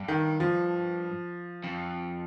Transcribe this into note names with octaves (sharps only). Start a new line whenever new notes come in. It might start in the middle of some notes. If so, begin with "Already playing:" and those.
Already playing: G2
D#3
F3
F2